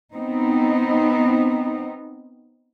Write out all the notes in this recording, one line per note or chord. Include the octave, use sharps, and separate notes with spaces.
B3 C4 D#4